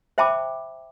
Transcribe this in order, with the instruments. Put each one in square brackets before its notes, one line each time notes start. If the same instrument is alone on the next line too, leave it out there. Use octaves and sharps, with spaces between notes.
[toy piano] C5 E5 G5 A5 B5 D6